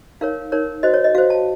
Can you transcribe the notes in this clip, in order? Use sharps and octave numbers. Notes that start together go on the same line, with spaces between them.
D#4 A#4 C#5 F5
D#4 A#4 C#5
F#4 C5 D#5
C#5
D#5
F#4 C5 F5
A5